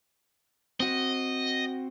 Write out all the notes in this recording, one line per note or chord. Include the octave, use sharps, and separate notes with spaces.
C4 F#4 D#5